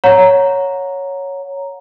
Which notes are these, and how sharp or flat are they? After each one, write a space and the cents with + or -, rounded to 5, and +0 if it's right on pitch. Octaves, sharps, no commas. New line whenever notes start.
C#5 +0 F#5 -25 A#5 +0